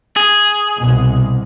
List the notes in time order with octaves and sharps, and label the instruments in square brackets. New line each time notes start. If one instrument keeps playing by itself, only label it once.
[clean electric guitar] G#4
[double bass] C2 B2